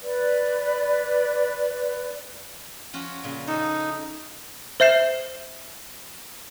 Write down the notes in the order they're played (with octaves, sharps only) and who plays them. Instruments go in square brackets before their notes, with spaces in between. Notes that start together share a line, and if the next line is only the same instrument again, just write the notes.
[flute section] B4 D5
[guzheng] F3 C#4 F#4
A#2 C#3
[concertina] D#4 [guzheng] G#4 A4
[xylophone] C5 E5 G6 C7 E7